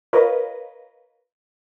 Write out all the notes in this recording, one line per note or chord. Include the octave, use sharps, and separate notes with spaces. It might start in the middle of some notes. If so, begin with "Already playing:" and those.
F4 A#4 B4 C#5 D#5